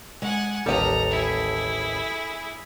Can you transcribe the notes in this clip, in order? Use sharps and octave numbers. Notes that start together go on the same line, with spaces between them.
G#3 F#5 G#5
A1 D#2 G3 A4 D#5 A#5
E4 G#4